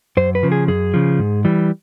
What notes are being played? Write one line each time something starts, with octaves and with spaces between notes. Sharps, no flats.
F#2 C5
B4
C#3 F3
G#4
F#2 G#4
C#3 F3
G#2
E3 G3